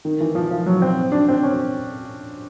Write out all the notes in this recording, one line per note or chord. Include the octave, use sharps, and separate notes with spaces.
D#3
E3
F3
F3
F#3
C4
D4
C4
C#4